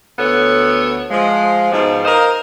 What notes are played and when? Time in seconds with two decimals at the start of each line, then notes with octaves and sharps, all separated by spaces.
0.19 D2 B3 A4 C#5
1.10 F3 G#3
1.71 G#2 B2 F3
2.05 A#4 C5 D#5 F5